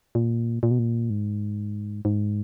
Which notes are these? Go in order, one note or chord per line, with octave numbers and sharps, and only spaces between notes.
A#2
A#2
B2
A#2
G#2
G#2